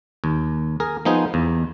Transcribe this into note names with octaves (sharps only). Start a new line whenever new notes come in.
D#2
G#4 A#4
F3 B3 D#4 G#4 C5
E2